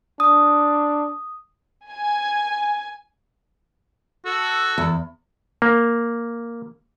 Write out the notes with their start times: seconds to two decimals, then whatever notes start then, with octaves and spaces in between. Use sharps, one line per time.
0.20 D4 D#6
1.89 G#5
4.25 F#4 A4 E6
4.78 E2
5.62 A#3